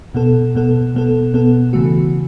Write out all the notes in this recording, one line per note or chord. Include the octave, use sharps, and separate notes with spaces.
B2 B3 A4
B2 B3 A4
B2 B3 A4
B2 B3 A4
C#3 E3 A3 F#4